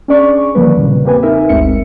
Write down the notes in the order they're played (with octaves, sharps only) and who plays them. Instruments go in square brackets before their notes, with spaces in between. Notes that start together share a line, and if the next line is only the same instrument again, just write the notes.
[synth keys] C#4 D4 G#4 D5 C#6
D3 D#3 F3 G3 A#3 B4
E2 A#2 C#3
A#3 C4 G4 B4 G#5
D#4 A#4 E5
G1 D2 G#3 C4 E5 C#7